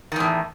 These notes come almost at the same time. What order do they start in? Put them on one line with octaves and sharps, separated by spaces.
D#3 E2 A2